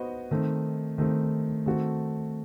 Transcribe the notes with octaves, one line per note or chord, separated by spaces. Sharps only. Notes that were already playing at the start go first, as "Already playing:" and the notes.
Already playing: B3 F#4 C5 D#5
D#3 A3 C4
D#3 A3 C4
D#3 A3 C4 F#4 A4